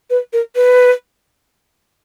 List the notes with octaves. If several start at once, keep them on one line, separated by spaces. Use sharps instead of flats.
B4
A#4
B4